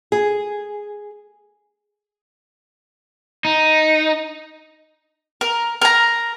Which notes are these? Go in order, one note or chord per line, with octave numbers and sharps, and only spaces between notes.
G#4
D#4
A#4
A#4 A#5